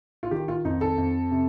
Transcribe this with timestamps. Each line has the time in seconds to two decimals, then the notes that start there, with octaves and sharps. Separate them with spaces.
0.23 F4
0.31 D#3 G4
0.48 F4
0.65 F2 D#4
0.81 A4
0.98 F2
1.31 C3